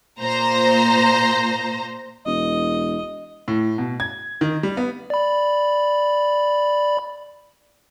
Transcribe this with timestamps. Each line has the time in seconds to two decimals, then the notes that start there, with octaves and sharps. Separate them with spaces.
0.19 A#2 C5 A#5
2.26 E1 D#5
3.48 A2
3.78 B2
4.00 G#6
4.41 D#3
4.63 G3
4.77 B3
5.10 D5 B5